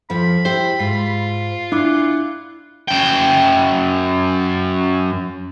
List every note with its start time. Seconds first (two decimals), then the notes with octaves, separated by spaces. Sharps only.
0.10 F2 F3 B5
0.45 E4 G4 C5
0.79 G#2 F4
1.72 D4 E4 F#5 D6
2.88 F#2 G5